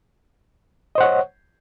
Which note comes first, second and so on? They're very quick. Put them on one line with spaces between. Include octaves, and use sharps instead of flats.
D#5 C5 F#5 C#5